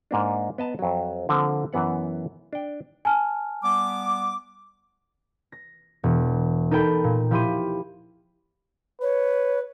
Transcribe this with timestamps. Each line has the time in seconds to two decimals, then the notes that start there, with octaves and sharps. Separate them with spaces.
0.11 G#2 A#3 D4
0.58 B3 D#5 A5 A#5
0.79 F2 F#3
1.29 D3 F3 A#3 C4
1.73 F#2 E3 B3 F#5
2.53 D4 G5
3.05 G#5 A5 F6
3.63 G3 B3 D6
5.52 A#6
6.03 E1
6.71 D#4 A4 A#4 G5 B5
7.04 A#2
7.31 F3 E4 G4 B5 C6 D#7
9.02 B4 C#5